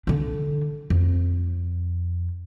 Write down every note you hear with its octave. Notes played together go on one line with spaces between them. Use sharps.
D3 D4
F2